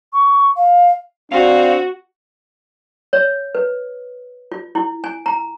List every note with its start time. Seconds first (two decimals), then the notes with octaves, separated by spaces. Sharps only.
0.13 C#6
0.56 F5
1.32 C4 D4 F#4 F5
3.13 C#5
3.55 B4
4.52 F4
4.75 E4
5.04 G#5
5.26 A#5